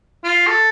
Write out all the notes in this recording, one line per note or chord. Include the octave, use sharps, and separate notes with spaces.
F4
A4